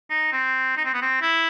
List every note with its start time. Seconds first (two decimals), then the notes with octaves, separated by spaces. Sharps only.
0.10 D#4
0.32 C4
0.77 D#4
0.85 C4
0.94 B3
1.02 C4
1.22 E4